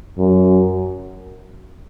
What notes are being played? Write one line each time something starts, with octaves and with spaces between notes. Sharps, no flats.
F#2